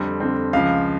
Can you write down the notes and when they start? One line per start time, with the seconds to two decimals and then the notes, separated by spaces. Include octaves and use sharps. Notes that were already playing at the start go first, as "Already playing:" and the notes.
Already playing: F2 D3 G3 C4
0.20 F2 D3 G3 C4
0.53 C#2 C#3 F3 F5